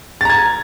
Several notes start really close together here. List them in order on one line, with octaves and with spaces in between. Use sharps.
A6 A#5 G#6